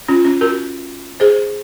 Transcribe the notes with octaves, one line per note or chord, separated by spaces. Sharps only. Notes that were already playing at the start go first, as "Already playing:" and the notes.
C#4 F4
C#4
F#4 A#4
G#4 C5